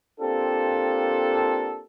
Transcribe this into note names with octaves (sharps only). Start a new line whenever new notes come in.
A#3 C4 D4 F4 G4 A4